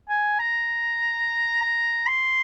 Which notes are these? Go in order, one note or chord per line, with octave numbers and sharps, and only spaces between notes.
G#5
A#5
A#5
C6